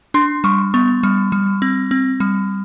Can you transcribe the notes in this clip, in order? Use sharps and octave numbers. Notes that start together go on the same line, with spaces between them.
D4 C6
G3 C#6
B3 C#6
G3
G3
C4
C4
G3